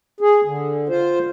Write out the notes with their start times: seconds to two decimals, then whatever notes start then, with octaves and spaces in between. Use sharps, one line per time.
0.21 G#4
0.45 D3
0.89 F4 C5